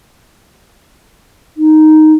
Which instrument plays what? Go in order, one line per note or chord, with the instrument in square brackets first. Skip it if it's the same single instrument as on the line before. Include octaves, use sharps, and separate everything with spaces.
[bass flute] D#4